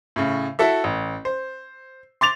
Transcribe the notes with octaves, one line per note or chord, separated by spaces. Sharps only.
A2 C#3
E4 F#4 A4 E5
A1
C5
C6 D6 A6 F7